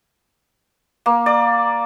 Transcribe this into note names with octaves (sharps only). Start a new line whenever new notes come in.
A#3
D5